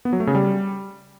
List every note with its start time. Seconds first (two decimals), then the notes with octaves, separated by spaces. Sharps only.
0.05 B3
0.13 F#3
0.20 A3
0.27 C#3
0.35 G3